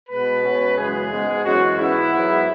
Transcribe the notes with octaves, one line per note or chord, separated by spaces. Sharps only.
B2 G#3 B3 B4
B2 G#3 C#4
F#2 C#3 E3 G#3 B3 G#4
G#2 G#3 B3
F#2 E3 G#3 C#4 F#4
G#2 E3 B3 E4
G#2 F#3 B3